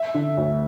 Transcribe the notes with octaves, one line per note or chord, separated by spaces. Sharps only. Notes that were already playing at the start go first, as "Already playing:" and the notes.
Already playing: E5
D3
D2